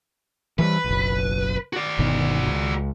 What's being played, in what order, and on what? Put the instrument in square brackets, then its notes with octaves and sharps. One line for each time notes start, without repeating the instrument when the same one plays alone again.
[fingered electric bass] E3 F3 G3 [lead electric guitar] B4
[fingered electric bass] F#1 B1
[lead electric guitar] F#4 D5
[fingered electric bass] G1 B2 D#3
C#2